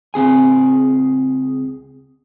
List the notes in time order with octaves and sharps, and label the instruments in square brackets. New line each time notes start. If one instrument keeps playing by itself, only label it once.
[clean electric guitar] C#2 C4 G#4 G#5